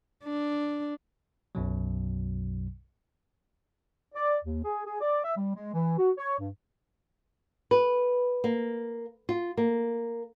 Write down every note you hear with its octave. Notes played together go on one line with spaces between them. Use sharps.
D4
B1 F#2 B2 F#3
D5
D#2
G#4
G#4
D5
E5
G3
G#3
E3
F#4
C#5
G2
B4
A#3
F4
A#3